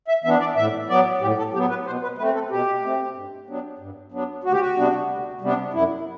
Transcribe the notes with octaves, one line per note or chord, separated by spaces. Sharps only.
E5
E3 B3 D4 E5
D5
A2 E5
F#3 B3 D5
A2 G4
A4
F#3 B3 G4
B4
B2 C5
B4
A3 C4 B4
A4
B2 G4
A3 C4
G2
F#3 B3 D4
G2
F#3 B3 D4
D2 F#4
G4
F#4
C3 G3 B3 D4
D2
C3 G3 B3 D4
F#2 E4